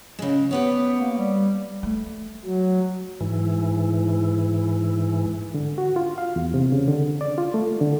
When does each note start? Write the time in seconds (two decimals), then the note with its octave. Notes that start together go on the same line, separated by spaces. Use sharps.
0.19 C#3 G#3
0.51 B3 G4 B4 C#5
1.00 A#3
1.18 G3
1.83 A3
2.45 F#3
3.21 G#2 E3
5.54 D3
5.78 F#4
5.96 F4
6.18 F5
6.36 E2
6.54 C3
6.72 C#3
6.88 D3
7.21 D5
7.38 F4
7.54 A3
7.81 D3